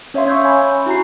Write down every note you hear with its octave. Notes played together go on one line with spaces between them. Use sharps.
C#4 C#5 E5 F5 C6
C#6 E6 G6 G#6
G#5 B5
E4 F#4 A#5 C7